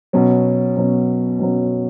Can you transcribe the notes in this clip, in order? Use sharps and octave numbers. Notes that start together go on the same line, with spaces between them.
B2 F#3 C#4
B2 F#3 C#4
B2 F#3 C#4